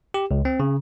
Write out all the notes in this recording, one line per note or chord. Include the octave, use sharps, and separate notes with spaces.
G4
C#2
C4
C#3